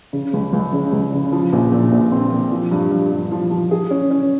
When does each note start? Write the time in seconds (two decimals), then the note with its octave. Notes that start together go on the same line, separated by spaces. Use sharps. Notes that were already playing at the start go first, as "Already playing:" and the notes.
0.13 C#3
0.33 C#2
0.53 C#2
0.73 C#3
0.93 C#2
1.13 C#3
1.32 F3
1.53 A#1
1.72 A#2
1.92 A#1
2.12 C4
2.32 A#2
2.52 F3
2.71 G2
2.91 G2
3.11 G2
3.31 F3
3.51 F3
3.71 G#4
3.91 C#4
4.11 C#4